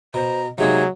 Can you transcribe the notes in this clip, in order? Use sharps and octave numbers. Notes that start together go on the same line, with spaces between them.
B2 C5 A#5
C3 F#3 G#3 A#3 D#4 G#4